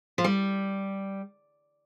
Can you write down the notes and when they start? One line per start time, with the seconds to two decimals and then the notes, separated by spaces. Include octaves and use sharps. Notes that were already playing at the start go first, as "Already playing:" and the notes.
0.18 F3
0.24 G3